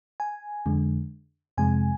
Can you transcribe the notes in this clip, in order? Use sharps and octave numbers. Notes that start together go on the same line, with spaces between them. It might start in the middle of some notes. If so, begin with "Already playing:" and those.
G#5
F2 D3 G#3
F2 C3 G#3 G#5